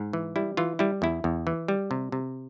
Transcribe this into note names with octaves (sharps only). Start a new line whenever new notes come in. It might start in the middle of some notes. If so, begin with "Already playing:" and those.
Already playing: G#2
E3
G3 E4
E3 F4
G3 E4
E2 E4
E2
E3
G3
C3
C3